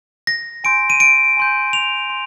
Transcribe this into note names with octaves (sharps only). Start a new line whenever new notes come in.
A#6
G#5 C6 G6 D7
D#7
D7
G#5 C6 G6
F7
C6